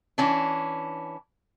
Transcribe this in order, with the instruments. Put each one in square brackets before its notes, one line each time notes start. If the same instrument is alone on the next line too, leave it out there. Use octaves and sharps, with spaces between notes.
[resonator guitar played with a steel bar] E3 C#4 D4